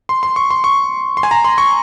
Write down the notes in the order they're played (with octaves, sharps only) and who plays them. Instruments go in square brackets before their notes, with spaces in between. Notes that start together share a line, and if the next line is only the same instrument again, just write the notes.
[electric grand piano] C6
C6
C#6
C6
C#6
C6
G#5
A#5
C6
C#6